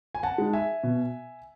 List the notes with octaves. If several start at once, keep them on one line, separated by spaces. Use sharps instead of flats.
G#5
F#5 A5
G#3 D#4
E5 G#5
B2